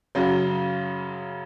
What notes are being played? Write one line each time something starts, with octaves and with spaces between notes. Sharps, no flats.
F#2 C#3 F#3